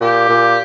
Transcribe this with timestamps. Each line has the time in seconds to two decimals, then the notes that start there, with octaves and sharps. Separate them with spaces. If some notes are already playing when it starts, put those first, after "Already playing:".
0.01 A#2 G4
0.29 A#2